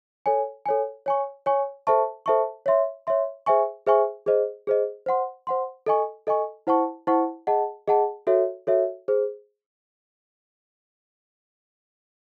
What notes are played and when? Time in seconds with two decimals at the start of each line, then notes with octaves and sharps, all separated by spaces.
0.26 A4 C#5 G#5
0.66 A4 C#5 G#5
1.06 C#5 G#5 C#6
1.46 C#5 G#5 C#6
1.87 A4 C5 E5 A5 C#6
2.26 A4 C5 E5 A5 C#6
2.66 C#5 E5 C6
3.07 C#5 E5 C6
3.46 G#4 C5 E5 G#5 C#6
3.86 G#4 C5 E5 G#5 C#6
4.26 G#4 C5 D#5
4.67 G#4 C5 D#5
5.06 C5 F#5 C6
5.47 C5 F#5 C6
5.86 A4 D#5 G#5 C#6
6.27 A4 D#5 G#5 C#6
6.67 E4 C5 F#5 A5 C#6
7.07 E4 C5 F#5 A5 C#6
7.47 G#4 D#5 F#5 A5
7.88 G#4 D#5 F#5 A5
8.27 F#4 A4 C#5 E5
8.67 F#4 A4 C#5 E5
9.08 G#4 C5